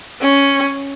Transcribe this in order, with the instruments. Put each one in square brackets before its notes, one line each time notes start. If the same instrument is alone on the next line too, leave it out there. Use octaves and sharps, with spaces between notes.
[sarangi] C#4